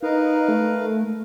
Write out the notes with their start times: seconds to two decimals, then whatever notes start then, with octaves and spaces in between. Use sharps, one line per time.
0.03 D#4 A#4 B4 F5
0.48 A3